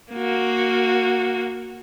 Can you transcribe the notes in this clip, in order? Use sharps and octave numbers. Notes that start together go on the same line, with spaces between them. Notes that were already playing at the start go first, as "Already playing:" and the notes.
A#3 F#4